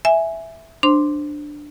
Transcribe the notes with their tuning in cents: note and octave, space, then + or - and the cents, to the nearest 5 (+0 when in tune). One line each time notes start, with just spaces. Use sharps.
E5 +0 G#5 +0
D4 +10 C5 +0 C6 +0